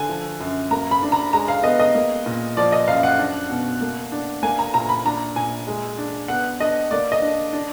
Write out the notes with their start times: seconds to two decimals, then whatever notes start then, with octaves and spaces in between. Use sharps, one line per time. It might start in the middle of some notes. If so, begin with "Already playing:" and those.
Already playing: D3 G#5
0.09 F3
0.40 F#2
0.71 A#3 A#5
0.91 B5
1.03 D4
1.12 A#5
1.33 G#3 A#5
1.48 F5
1.63 B3 D#5
1.80 D#5
1.95 A#3
2.26 A#2
2.57 F3 D5
2.72 D#5
2.88 F#2 F5
3.03 F#5
3.19 D4
3.50 B2
3.81 A#3
4.12 D4
4.43 A#3 G#5
4.59 A#5
4.74 A#2 A#5
4.89 B5
5.05 D4 A#5
5.36 A#2 G#5
5.67 G#3
5.98 D4
6.28 B3 F#5
6.60 D4 D#5
6.91 A#3 D5
7.12 D#5
7.22 D4
7.53 D4